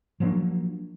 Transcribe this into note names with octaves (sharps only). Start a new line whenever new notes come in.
F3 F#3 A#3 D4